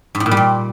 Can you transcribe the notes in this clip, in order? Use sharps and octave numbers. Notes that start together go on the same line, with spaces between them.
G#2
A2
A#2
G3
A#2